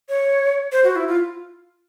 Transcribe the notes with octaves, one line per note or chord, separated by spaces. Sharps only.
C#5
C5
F#4
E4
F4